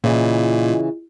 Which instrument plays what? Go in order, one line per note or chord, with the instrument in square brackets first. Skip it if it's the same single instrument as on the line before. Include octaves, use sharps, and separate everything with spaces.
[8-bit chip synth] A#2 [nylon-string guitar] C#3 E3 [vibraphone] F4 D#5